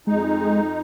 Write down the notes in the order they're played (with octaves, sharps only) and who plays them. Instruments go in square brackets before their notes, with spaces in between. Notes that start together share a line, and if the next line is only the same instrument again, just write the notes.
[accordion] F2 D#4 [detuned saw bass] G#3